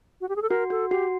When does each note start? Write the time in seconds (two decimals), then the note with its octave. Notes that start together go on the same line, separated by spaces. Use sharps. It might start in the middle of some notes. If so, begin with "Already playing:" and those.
0.21 F#4
0.29 G4
0.36 G#4
0.42 A4
0.49 F#4 A#4
0.70 F#4 A4
0.91 F#4 G4